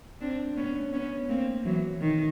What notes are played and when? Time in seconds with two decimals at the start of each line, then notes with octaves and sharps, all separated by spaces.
0.21 C4 D4
0.57 B3 C#4
0.93 B3 C#4
1.29 A#3 C4
1.65 E3 F#3
2.01 D#3